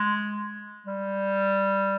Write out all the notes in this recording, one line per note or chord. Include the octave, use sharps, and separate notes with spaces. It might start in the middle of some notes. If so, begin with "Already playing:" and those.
Already playing: G#3
G3